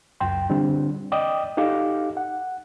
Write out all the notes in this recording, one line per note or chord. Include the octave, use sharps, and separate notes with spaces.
C#2 F#2 G5 C6
D3 G3 C4 D4
D5 D#5 G5 D6 D#6
D#4 G4 A4 F5 D6
F#5